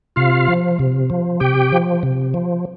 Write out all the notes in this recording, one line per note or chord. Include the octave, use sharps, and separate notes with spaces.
C3 F4 F5
F3
C3
F3
C3 G4 G5
F3
C3
F3